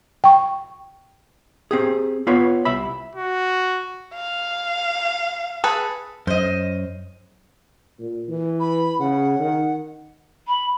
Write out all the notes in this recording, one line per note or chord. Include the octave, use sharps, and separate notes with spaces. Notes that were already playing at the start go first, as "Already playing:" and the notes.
G5 C#6
C4 G4 G#4
B3 F4 B4 C#5
C2 E5 B5
F#4
F5
G#4 A4 B4
F#2 C5 D#5
A#2
E3
B5
C#3 F#5
D#3
B5